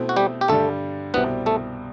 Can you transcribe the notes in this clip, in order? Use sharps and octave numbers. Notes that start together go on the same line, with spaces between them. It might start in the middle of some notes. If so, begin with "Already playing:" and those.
Already playing: B2 A3 C4 E4
F#4
G3 G4
G4
G2 D3 G3 A3 A4
C2 B2 G3 B3 C4 E4 B4
A3 A4